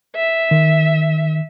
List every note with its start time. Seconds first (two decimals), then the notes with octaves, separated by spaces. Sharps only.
0.16 E5
0.51 D#3